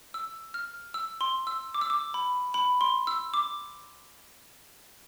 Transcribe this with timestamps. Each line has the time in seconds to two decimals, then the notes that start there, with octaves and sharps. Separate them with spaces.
0.14 E6
0.54 F6
0.94 E6
1.21 C6
1.47 E6
1.74 D6
1.81 E6
1.90 D6
2.14 B5
2.54 B5
2.81 C6
3.07 E6
3.34 D6